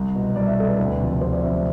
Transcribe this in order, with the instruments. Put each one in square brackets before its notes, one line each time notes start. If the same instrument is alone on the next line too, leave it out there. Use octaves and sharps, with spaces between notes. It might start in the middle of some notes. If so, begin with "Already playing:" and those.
Already playing: [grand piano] C2
B2
C2 D5
E5
B2 A4
B4
D2 B4
C3 F3
D2 C5
D5
C3 F3 E5
E5